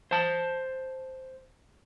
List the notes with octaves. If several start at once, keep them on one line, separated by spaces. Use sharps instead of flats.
C5 A5